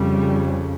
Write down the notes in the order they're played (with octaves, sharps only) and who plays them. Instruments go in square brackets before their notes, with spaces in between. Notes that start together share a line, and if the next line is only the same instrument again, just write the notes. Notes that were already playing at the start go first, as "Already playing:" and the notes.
Already playing: [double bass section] F2 C#3 G3